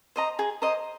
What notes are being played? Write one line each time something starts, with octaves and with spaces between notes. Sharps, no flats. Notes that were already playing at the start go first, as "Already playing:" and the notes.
C5 D#5 A#5
G#4
C5 D#5 A#5